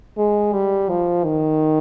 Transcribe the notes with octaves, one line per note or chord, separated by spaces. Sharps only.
G#3
G3
F3
D#3